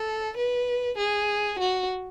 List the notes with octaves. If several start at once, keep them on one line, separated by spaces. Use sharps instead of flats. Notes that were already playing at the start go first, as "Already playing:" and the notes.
Already playing: A4
B4
G#4
F#4